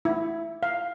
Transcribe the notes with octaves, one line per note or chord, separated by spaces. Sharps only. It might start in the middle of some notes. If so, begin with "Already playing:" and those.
E4
F5